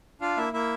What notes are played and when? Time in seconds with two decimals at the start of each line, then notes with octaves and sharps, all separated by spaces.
0.21 D4 F4 F5
0.37 A#3 E4 E5
0.53 A#3 E4 E5